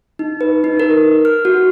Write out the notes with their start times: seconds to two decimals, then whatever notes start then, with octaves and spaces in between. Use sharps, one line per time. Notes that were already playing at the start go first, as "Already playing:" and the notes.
0.19 D#4
0.41 B4
0.64 D#4
0.80 A#4
1.25 F6
1.45 F#4